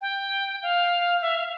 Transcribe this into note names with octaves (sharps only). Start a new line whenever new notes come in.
G5
F5
E5
F5